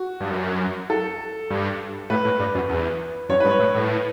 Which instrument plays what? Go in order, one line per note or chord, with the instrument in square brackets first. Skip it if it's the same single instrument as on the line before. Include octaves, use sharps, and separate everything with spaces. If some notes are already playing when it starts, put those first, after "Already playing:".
Already playing: [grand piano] F#4
[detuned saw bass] G2
F#2
[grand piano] A4
[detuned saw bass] G2
[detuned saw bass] A2 [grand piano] B4
[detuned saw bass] A2
G2
F#2
E2
[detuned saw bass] F#2 [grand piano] C#5
[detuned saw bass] G2 [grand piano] B4
[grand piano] C#5
[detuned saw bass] A2
A2